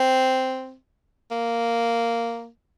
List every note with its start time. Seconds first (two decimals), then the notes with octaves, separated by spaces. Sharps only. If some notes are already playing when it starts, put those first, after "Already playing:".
Already playing: C4
1.31 A#3